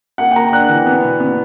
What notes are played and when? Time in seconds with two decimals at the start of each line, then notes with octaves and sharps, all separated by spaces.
0.18 A#3 F#5
0.31 G5
0.36 A#3 A#5
0.52 D4 F#6
0.69 E3
0.86 B3
1.04 B2
1.20 B3